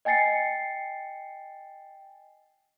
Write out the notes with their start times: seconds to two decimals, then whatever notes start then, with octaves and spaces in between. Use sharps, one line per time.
0.05 D#5 G5 G#5 A6 C7 C#7